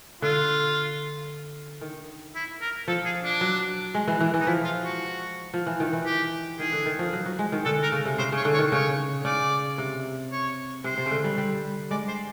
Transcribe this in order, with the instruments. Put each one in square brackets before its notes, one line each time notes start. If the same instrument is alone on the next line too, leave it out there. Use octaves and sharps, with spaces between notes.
[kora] D3 [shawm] F4
[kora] D#3
[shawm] E4
A#4
[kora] F3 [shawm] A4
[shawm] G#4
D4
[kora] F#3
G#3
E3
E3
E3
[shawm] D#4
[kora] F3 [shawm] E4
[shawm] F4
F#4
[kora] F3
E3
D#3
E3
[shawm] G4
[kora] D#3 [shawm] G#4
[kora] D3
D#3
F3
F#3
F#3
G#3
D#3
[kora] D3 [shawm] A4
[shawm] A#4
[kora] C#3
C3
[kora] C#3 [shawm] C5
[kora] C#3 [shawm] C#5
[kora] D3
[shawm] C#5
[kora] D#3
[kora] C#3 [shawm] C#5
[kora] C#3 [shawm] D5
[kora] C3
[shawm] C#5
[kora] C3 [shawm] C5
[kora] C3
C#3
D3
G3
G3
[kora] G#3 [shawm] D5
[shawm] C5